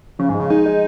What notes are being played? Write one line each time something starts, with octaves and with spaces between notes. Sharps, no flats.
C#3 F3
G#2
G#3
C#3
G#3 D#4
G#3